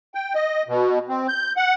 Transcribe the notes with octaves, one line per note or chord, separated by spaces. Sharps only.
G5
D#5
B2
C4
G6
F#5